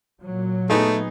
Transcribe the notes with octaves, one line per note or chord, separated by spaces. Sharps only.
A#2 F#3
A3 B3 D#4 G#4